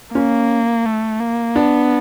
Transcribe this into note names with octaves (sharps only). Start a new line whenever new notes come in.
A#3 C#4
A3
A#3
B3 D4